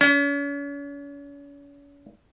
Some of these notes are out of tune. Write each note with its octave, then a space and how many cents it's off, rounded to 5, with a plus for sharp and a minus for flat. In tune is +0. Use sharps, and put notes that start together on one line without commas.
C#4 +40